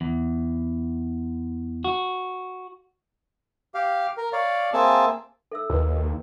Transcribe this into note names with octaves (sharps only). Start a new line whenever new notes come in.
E2
F#4
G4 F5
A#4
C#5 D5 F5
A#3 C4 G#4 E5 A5
A4 E5 E6
D#2 F#4 B4